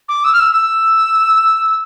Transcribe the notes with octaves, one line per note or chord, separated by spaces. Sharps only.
D6
E6
F6
E6
E6